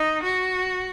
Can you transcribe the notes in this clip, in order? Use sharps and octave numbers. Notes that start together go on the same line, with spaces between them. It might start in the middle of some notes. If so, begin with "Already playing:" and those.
Already playing: D#4
F#4